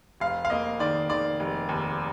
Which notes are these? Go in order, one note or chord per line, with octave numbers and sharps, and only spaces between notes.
F1 F5
F5
A#3 D#5
D#3 D5
D#3 D5
F1
D#2